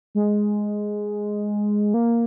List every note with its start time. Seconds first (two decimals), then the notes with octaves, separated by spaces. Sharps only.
0.15 G#3
1.94 A#3